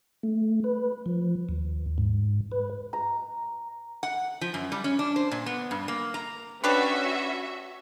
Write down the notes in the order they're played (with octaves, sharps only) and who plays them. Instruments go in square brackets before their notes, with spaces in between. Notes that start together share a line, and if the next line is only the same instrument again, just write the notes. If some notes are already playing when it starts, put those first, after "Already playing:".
[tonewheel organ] A3
B4
F3
D#2
G#2
B4
[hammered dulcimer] A#5
[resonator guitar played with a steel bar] F#5
F3
F#2
G3
C#4
D4
C5
A#2
B3
G2
A#3
A#5
[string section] C#4 F#4 E5 [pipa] D4 G4 B4